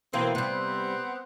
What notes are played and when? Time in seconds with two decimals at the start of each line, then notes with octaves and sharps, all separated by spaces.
0.13 B2 E3 A#3 C4
0.35 C3 G3 B3 C4 F#5